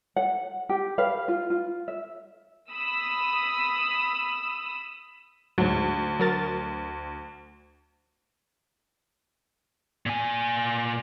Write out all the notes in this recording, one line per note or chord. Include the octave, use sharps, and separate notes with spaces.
F#5
G4
B4 F5
F4
F4
E5
B5 D#6 E6
D2 G#2 F#3
F#3 A#4 A6
A#2 G#5